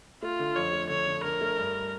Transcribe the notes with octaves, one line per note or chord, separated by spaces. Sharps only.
A3 F4
D3
F2 C#5
A3
D3 C#5
D3
D3 A#4
A3
G2